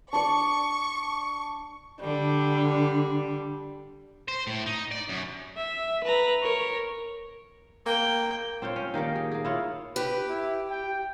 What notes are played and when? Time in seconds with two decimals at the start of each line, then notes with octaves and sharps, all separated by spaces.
0.13 D4 D5 C#6
2.00 D3 G3
4.28 C5
4.47 A2
4.66 D#4
4.92 D5
5.09 F#2
5.57 E5
6.03 B4 A#5
6.43 A#4 C#5
7.86 A#3 G5
8.62 C4 F4 C5 C#5
8.76 C#4
8.94 D#3 A#3 G4 D5
9.16 G#4
9.32 A#3 G#4
9.45 E4 F4 C#5
9.96 G4 B4
10.29 E4
10.71 G5